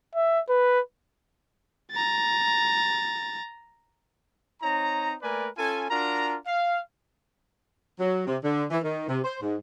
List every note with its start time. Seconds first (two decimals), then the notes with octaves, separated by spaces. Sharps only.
0.15 E5
0.49 B4
1.91 A#5 A6
4.62 C4 D#4 C#5 A#5
5.22 A3 A#3 A#4 B4 D5 G#5
5.58 C#4 F4 A4 G#5
5.90 D4 F4 F#4 A#4 A#5
6.47 F5
8.00 F#3
8.27 C3
8.43 D3
8.70 E3
8.83 D#3
9.08 C3
9.24 C5
9.42 G#2